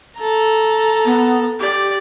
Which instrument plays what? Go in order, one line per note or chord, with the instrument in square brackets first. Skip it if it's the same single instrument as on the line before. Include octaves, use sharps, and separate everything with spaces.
[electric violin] A4 A#5
[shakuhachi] B3
[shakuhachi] G4 [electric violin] D5